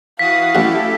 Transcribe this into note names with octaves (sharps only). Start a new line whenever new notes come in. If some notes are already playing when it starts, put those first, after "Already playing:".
E3 F#4 F5 D#6 B6
A1 E4 F#4 G4 A4